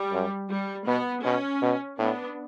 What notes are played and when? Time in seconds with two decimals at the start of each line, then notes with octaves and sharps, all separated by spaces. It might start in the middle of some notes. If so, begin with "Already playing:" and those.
Already playing: G3
0.12 F#2
0.49 G3
0.86 B2 B3
1.24 B2 C#4
1.62 B2
1.99 A2 B3 D4